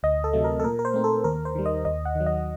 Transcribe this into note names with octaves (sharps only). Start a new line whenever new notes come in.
D2 D#5
A4
C3 F#3 A3
A#4
A4
A#2 A#4
A#4
C5
A3 C4 D#4
A4
D#2 A#4
C5
D#3 G3
D#5
D#2 D#5
F#5
D#3 F#3
D#5